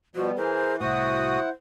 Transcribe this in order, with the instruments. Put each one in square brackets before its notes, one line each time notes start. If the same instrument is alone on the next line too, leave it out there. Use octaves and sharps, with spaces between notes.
[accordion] B2 F3 [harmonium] G3 B3 [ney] F#4
[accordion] E3 [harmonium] G#4 A#4 [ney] C5
[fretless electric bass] C2 A2 [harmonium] E4 F#5 [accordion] F#4 D#6 [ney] C5